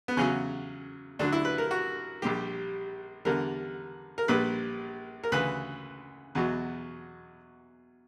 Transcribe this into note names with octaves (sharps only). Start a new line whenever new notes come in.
B3
E2 C#3 F#3 C#4
D2 D3 F#3 D4
E4
B4
A#4
F#4
A#1 A#2 G3 G4
E2 D3 G3 A#4
A#4
A#1 A#2 G3 B4
A#4
D2 C#3 E3 B4
E2 B2 F#3